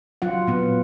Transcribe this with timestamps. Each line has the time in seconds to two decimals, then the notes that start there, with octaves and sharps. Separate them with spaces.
0.22 F#3 F4 F#5
0.47 A#2 B3